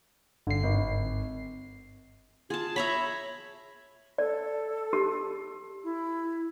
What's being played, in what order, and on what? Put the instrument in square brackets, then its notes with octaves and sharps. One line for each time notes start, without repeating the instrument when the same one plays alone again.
[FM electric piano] G1 C7 [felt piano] D3
[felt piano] G#1
[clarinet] F4 [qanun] G#4 A5
[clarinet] C#5 [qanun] E5 A#5 B5
[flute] A4 [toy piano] D5
[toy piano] G4
[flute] E4